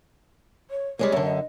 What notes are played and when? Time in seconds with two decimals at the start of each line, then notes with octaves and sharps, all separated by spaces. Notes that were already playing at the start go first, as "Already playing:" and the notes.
0.71 C#5
0.99 G3 G#3 A#3 C#5
1.12 F#2 D3
1.25 D#5